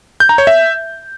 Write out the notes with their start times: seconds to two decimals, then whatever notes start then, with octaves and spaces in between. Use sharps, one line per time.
0.20 G6
0.29 A#5
0.38 C#5
0.47 E5